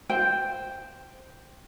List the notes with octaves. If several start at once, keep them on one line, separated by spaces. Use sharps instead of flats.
C5 G5